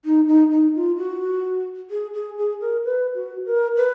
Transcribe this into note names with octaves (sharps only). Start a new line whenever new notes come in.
D#4
D#4
D#4
F4
F#4
G#4
G#4
G#4
A#4
B4
F#4
A#4
B4